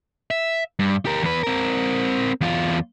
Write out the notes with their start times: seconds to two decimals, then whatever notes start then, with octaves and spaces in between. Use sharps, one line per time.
0.31 E5
0.79 G2
1.05 G4 A#4
1.22 E2 B4
1.43 C4 A#4
2.41 E2 F4